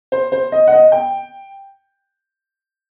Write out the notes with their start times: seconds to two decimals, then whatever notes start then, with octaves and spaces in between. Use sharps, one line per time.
0.12 C5
0.32 C5
0.52 D#5
0.67 F#5
0.72 D#5
0.92 G5